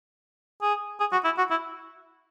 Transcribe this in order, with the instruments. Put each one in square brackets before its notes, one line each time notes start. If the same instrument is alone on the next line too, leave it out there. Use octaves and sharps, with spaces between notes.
[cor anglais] G#4
G#4
F#4
E4
F#4
E4